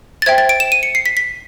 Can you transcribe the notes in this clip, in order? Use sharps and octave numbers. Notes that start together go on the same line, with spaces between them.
A6
C5 E5 G5 G#6
A6
D7
E7
D#7
C#7
C7
B6
B6